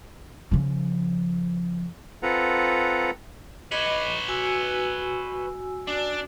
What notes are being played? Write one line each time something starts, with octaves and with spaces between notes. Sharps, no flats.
C#3 F3
C4 F4 A4 B4 F#5 A#5
B4 C#5 D#5 B5 D6
F#4 G#5 E6
D4